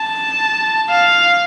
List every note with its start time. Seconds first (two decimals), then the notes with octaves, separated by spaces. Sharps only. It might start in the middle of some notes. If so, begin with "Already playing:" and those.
Already playing: A5
0.90 F5